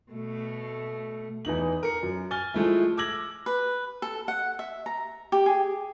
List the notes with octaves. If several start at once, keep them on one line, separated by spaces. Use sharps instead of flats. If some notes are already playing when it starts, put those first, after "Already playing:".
B2 A3
E2 E3 D#4 F#7
A#4 C#7
F#2
G#5 F6 A6 G7
F3 G#3 A3 E4
D6 E6 G#6 A#6 F#7
B4
A4
F#5
E5
A#5
G4
G#4